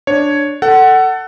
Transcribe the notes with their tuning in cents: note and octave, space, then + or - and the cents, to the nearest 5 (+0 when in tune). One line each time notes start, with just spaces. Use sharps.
D4 +0 C#5 +0
A4 +15 F#5 +20